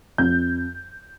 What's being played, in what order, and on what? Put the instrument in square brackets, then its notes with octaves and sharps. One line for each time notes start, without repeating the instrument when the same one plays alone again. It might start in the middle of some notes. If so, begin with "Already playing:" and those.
[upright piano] F2 G6